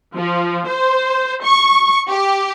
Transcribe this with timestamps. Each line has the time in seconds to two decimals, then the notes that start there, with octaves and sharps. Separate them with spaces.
0.16 F3
0.68 C5
1.43 C#6
2.08 G4